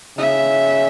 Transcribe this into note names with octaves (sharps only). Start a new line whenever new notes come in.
C#3 E5